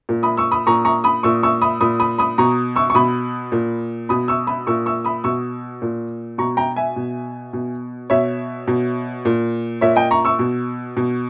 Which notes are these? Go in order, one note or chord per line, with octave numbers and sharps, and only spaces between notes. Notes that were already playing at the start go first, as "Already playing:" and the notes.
A#2
B5 D#6
C#6 E6
B5 D#6
A#2 A#5 C#6
A#5 C#6
B5 D#6
A#2 C#6 E6
C#6 E6
B5 D#6
A#2 B5 D#6
B5 D#6
B5 D#6
B2 A#5 C#6
C#6 E6
C#6
B2 B5 D#6
A#2
B2 B5 D#6
C#6 E6
B5 D#6
A#2 C#6 E6
C#6 E6
B5 D#6
B2 C#6 E6
A#2
B2 A#5 C#6
G5 A#5
E5 G#5
B2
B2
B2 C#5 E5
B2
A#2
A#2 C#5 E5
D#5 G5
A#5 C#6
C#6 E6
B2
B2